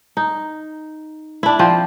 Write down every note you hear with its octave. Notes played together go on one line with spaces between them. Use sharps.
D#4
D4 E4
F3 C4